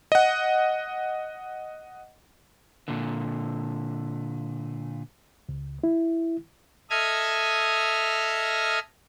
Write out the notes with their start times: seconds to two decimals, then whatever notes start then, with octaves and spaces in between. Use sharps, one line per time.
0.12 D#5 F#5
2.88 A#2 D3
5.49 C#2
5.84 E4
6.90 A4 D#5 E5 D#6 F6 G#6